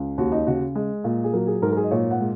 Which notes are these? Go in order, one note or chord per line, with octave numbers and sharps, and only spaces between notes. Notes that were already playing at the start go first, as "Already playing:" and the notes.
Already playing: C#2
D#2 F#4
D#4
C#3 F#4
G#3
A#2
G#4
F#3 A#4
G#4
G#2 A#4
A#4
G#4
D#5
A#2 C#5
F#5
G#3